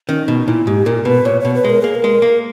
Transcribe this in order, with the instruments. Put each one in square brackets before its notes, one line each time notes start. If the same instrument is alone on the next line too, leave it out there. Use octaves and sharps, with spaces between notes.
[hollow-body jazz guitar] D#3 [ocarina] C#4
[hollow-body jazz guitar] B2 [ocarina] D#4
[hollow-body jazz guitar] A#2 [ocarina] E4
[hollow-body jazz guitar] G#2 [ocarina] G4
[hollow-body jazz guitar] A#2 [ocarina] A#4
[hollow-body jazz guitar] B2 [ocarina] B4
[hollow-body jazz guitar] A#2 [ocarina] C#5
[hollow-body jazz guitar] B2 [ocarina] C#5
[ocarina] B4
[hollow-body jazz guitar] G#3
[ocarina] A#4
[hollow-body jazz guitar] A#3 [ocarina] G#4
[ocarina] A#4
[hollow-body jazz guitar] G#3
A#3